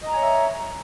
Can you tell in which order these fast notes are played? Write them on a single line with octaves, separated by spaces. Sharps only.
D#5 A#5 G#5 C#5 E5